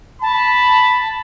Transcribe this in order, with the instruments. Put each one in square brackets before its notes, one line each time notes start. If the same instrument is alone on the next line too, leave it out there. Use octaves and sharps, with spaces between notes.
[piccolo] A5 [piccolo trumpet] B5